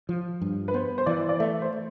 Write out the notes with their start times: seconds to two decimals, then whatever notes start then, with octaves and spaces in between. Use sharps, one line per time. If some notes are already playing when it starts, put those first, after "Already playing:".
0.09 F3
0.42 G2
0.68 B4
0.74 B3 C5
0.98 C5
1.06 E3 D5
1.29 D5
1.40 A3 E5
1.62 C5